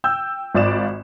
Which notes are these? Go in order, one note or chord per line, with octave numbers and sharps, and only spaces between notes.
G5 E6 G6
G#1 F4 D5 D6 E7